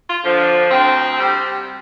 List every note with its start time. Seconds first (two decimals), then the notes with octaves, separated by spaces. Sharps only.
0.09 F4
0.25 D3 F3
0.40 D4
0.70 D2 C4
1.18 C3 G3